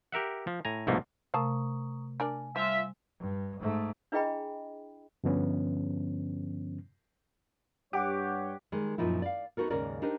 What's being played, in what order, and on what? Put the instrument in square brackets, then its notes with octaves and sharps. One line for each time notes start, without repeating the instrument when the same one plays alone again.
[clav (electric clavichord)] G4 A#4 E5 F#5
F3
A2 G#5 A#5
C2 G#2 B2 F3 A3 A#3
[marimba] C3 A3 A#4 [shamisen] F5 A5 [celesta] A#5 C#6 D#6
[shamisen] D4 A#4 D5 [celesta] G#5
[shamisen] F3 [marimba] G3 [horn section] F4 E5
[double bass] G2
G#2 A3
[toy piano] D4 E4 G#4 D#5 G5 B5
[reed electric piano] G2 D3 F3 B3 C#4
[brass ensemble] G2 C#5 [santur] G4 [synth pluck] F#5 D6
[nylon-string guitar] D#3 G3 G#3
F#2 A#2 F3 D#4 E4
D5 F5
B3 D#4 F#4 A4 A#4
D#2 G#2 C#3 C#4 A#4 D5
D4 D#4 G4 A#4 C5 D#5